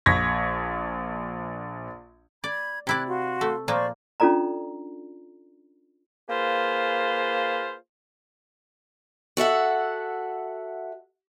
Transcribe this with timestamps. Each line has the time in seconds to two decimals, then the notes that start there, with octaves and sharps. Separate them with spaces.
0.06 A#1 C#6 G#6 A#6 B6
2.44 D5 B5 G#6
2.87 C3 E4 D5 F#6 G#6
3.07 F#4 F5 C6
3.41 A3
3.68 A#2 F3 A#3 C5 D5 C#6
4.20 C#4 D4 F4 A4 D5 A#5
6.29 A#3 F4 G#4 B4 C5
9.37 F#4 A4 E5 F#5